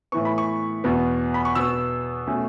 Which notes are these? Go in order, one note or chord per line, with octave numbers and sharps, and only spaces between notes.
A2 E3 B3 C#6
B5
C#6
E2 B2 B3
B5
C#6
B2 B3 E6
B2 A3 C#4